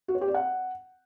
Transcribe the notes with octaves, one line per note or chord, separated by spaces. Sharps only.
F#4
C#5
G4
D5
F#5